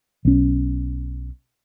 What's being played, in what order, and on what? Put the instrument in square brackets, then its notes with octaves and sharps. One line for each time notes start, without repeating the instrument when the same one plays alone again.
[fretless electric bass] B1 C#4